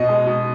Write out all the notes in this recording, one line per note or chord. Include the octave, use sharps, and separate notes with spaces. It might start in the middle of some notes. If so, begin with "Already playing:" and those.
Already playing: B2 D#5
G#3
B2